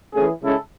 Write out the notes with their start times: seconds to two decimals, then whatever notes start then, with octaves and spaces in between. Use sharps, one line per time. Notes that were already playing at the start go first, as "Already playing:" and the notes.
0.14 E3 A3 C#4 G#4
0.43 C#3 G#3 C#4 E4 A4